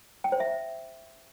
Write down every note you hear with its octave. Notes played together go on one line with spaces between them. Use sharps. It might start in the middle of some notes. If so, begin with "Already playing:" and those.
G5
C5
E5